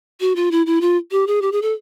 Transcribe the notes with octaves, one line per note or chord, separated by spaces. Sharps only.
F#4
F4
E4
E4
F4
G4
G#4
G4
G#4
A4